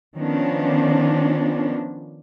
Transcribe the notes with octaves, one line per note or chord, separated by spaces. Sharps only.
D#3 F3 B3 C#4 D4